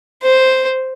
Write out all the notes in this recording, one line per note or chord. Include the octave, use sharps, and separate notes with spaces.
C5